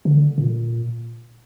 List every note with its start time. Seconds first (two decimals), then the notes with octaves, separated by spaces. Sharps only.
0.05 D3
0.38 A#2